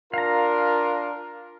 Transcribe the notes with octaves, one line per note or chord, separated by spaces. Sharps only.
D4 F4 A#4 F5 A#5